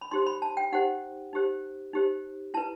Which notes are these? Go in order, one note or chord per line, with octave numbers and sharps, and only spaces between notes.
B5
D#4 G4 C5 C6
B5
A5
G5
D#4 G4 C5 F#5
D#4 G4 C5
D#4 G4 C5
E4 B4 A5